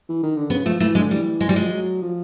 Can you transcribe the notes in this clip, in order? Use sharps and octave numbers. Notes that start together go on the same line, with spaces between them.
E3
D#3
D3
C#3 B3
F3 A3
E3 A3
D3 G#3
E3 G3
G#3
E3 G3
F3 G#3
F#3
F3